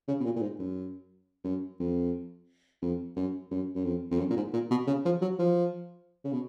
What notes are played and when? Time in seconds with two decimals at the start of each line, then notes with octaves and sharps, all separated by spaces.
0.08 C#3
0.20 B2
0.25 A#2
0.36 A#2
0.42 G#2
0.59 F#2
1.45 F#2
1.80 F2
2.82 F2
3.16 F#2
3.51 F#2
3.75 F#2
3.84 F2
4.11 F2
4.19 F#2
4.30 A#2
4.37 G#2
4.54 A#2
4.71 B2
4.87 C#3
5.05 F3
5.21 F#3
5.39 F3
6.25 C#3
6.32 B2